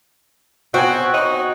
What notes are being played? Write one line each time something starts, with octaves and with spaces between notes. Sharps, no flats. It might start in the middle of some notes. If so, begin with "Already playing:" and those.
B3 C4 F#4 G5 G#5
D#4 C#5 C#6